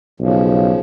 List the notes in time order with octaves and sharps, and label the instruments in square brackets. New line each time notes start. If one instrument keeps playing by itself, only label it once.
[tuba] B1 [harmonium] C#3 F3